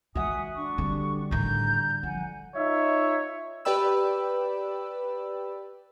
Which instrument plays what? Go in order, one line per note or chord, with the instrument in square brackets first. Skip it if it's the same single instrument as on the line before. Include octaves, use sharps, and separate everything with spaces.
[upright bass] D#3 G#3 [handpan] F#4 F#5 [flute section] E5 G#5 D#6
[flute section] D4 C#6
[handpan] D3 G3 [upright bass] C4
[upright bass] A2 D#3 [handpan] D3 [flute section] A#5 G6
[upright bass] F3 [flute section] F#5 G#5
[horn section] D#4 F4 C#5 E5
[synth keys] G4 B4 D5 G5 B5 E6